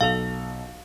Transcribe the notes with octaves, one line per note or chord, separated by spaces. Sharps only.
B1 A4 F5 F7